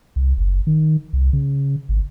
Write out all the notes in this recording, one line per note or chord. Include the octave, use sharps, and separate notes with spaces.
C2
F#1
D#3
C2
C#3
G#1